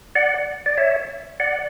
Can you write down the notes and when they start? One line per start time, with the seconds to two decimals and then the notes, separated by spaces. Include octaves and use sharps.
0.15 D5 F#5
0.66 D5
0.78 C#5 E5
1.40 D5 F#5